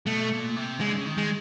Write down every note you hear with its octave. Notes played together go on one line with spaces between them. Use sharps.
B2 A3
A#2
C3
C#3 G#3
D3
C#3
D#3
G#3